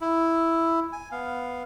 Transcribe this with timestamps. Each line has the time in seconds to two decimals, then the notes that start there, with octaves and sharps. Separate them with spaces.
0.01 E4
0.93 G#5
1.11 B3 F5